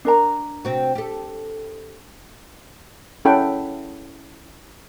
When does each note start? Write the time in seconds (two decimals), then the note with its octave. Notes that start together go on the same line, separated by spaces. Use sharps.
0.05 D4 A#4 A#5
0.65 C3 C4 F#4
0.95 G4 A4
3.25 C#4 E4 A4 F#5 G5 B5